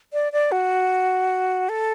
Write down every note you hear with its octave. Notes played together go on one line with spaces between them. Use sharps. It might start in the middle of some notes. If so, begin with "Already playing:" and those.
D5
D5
F#4
A4